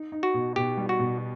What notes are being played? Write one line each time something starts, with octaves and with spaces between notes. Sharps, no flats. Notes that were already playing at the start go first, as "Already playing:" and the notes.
Already playing: D#4
D#4
F#4
B2
B2 G4
G3
F#4
B2